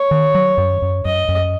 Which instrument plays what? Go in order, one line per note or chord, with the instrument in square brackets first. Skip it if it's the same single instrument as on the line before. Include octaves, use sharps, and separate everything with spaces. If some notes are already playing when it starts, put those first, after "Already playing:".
Already playing: [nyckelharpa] C#5
[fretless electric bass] D#3
F#3
F#2
F#2
[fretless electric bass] F#2 [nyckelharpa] D#5
[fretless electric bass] F#2